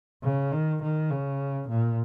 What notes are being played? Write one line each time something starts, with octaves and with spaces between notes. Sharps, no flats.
C#3
D#3
D#3
C#3
A#2